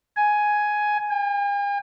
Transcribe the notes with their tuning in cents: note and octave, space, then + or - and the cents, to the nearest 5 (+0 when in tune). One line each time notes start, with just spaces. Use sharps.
G#5 +10
G#5 -45